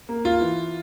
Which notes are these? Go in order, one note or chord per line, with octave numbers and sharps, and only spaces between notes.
A#3
F4
E3